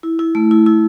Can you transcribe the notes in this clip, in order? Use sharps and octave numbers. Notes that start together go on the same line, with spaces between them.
E4
E4
A3
E4
E4